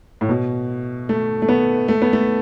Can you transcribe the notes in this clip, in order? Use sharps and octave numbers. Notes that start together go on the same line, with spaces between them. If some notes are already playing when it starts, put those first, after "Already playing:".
A2
B2
A3
A3
B3
A3
B3
A3